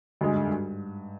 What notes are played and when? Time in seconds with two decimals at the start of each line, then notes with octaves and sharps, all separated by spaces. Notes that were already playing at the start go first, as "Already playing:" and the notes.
0.21 D2 G2 D3 G#3
0.34 G#2
0.46 G2